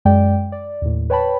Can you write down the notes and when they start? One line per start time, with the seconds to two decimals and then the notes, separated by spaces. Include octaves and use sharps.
0.05 F#2 G#3 D5 G5
0.52 D5
0.82 D#2 A2
1.10 B4 C#5 G5 A5 B5